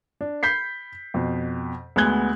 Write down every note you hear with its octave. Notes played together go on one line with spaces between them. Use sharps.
D4
B5 G6 B6 C7
F2 B2
D2 G#3 B3 F#6 G#6 G7